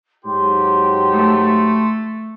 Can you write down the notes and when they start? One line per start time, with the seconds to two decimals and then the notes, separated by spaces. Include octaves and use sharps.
0.24 G#2 F#3 G4 C6
1.12 A3